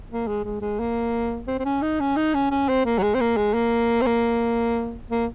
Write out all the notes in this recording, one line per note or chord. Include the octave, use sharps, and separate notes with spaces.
A#3
G#3
G#3
G#3
A#3
C4
C4
C#4
D#4
C#4
D#4
C#4
C#4
C4
A#3
F#3
G#3
C4
A#3
G#3
A#3
C4
A#3
A#3